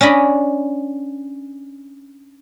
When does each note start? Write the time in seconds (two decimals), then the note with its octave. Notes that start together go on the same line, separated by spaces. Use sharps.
0.01 C#4 D4 D#5 B5